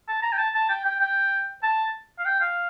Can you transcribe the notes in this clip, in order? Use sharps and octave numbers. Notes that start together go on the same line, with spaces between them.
A5
A#5
G5
A5
A5
G5
G5
G5
A5
F5
G5
F5